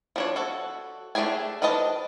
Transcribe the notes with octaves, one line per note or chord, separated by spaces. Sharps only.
F3 D4 C#5
F#4 A4
A3 D4 G4 G#4 G#5
F3 D4 B4 D#5 A5